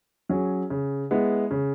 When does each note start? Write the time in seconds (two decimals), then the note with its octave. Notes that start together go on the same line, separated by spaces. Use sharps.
0.29 F#3 C#4 G#4
0.70 C#3
1.11 G#3 B3 E4
1.51 C#3